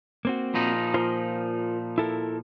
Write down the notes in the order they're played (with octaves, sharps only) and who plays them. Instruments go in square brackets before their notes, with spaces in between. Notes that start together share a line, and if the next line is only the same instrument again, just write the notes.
[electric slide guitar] A#3 C4 F#4
[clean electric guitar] A#2 F3 D#4
[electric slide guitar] F4 A#4 C5
E4 A4 A#4